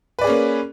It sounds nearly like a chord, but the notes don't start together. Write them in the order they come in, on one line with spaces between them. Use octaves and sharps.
B4 D5 G#4 C#4 A#3